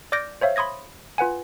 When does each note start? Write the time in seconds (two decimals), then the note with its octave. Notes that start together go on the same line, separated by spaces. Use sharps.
0.12 D5 D6 F6 G6 A#6 D7
0.41 C5 C#5 E5 F5
0.56 B5 C6 D#6 G#6 A#6
1.18 F4 B4 F#5 G#5